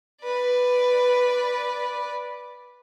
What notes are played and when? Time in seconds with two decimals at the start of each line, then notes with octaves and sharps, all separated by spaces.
0.23 B4 D5